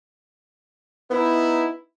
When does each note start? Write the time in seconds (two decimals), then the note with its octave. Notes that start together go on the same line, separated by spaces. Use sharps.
1.11 B3 D#4 E4